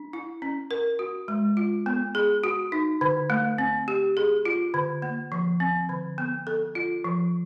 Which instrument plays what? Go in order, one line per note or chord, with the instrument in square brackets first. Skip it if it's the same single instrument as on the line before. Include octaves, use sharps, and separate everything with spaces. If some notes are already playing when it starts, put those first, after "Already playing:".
Already playing: [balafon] D4
E4
C#4
A#4
F#4
G#3
F4
B3
G#4
F#4
D#4
D3
A3
C4
G4
G#4
F4
D3
A#3
F3
C4
D3
B3
A4
F4
F3